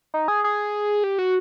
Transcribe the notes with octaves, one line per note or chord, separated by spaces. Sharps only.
D#4
G#4
G#4
G4
F#4